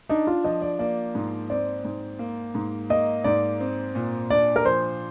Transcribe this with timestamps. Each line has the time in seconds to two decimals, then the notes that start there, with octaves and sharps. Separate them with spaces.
0.09 D4 D#4
0.27 F4
0.44 F3 D#5
0.62 D5
0.79 A#3 D5
1.15 G#2
1.50 C4 D5
1.85 G#2
2.19 A#3
2.55 G#2
2.90 A#3 D#5
3.24 G#2 D5
3.60 C4
3.95 A#2
4.30 D4 D5
4.56 A#4
4.65 F3 C5